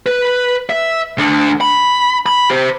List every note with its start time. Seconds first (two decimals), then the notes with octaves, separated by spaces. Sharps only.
0.06 B4
0.70 E5
1.18 D2 D3
1.61 B5
2.26 B5
2.50 G4 C5